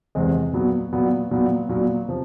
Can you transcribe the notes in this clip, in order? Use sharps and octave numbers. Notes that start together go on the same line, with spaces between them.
E2 C3 E3 G#3 C4
A#2 F#3 B3
A#2 F#3 B3
A#2 F#3 B3
A#2 F#3 B3
C3 F3